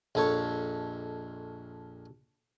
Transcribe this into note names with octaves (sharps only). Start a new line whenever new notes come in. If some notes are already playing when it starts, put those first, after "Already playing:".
A#1 F2 A4 C#5 C#6